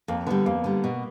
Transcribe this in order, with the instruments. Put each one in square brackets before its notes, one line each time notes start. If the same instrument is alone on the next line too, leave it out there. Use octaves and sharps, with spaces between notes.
[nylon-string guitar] F2 [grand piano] A#3
[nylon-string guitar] D3 G3 [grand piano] B3
[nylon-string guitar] F2 [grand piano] A#3
[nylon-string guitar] D3 G3
B2